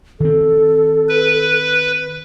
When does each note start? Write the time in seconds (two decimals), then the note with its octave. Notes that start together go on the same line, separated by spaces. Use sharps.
0.20 D#3 C4 A4
1.09 B4